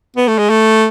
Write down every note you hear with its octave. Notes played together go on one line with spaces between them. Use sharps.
B3
A3
G#3
A3